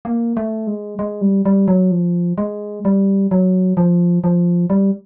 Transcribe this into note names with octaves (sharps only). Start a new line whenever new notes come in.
A#3
A3
G#3
G#3
G3
G3
F#3
F3
G#3
G3
F#3
F3
F3
G3